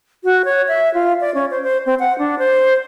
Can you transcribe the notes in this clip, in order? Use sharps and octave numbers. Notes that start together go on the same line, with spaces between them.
F#4
C#5
E5
F4
D5
C#4
C5
C5
C4
F#5
D4
C5